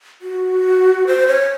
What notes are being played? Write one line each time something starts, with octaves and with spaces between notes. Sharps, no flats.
F#4
C5
C#5